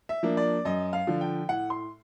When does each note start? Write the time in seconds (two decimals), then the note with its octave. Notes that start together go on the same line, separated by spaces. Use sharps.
0.09 E5
0.23 F3 A#3 D4
0.37 D5
0.65 F#2 D#5
0.93 F5
1.07 D3 F3
1.21 G5
1.49 A2 F#5
1.70 C6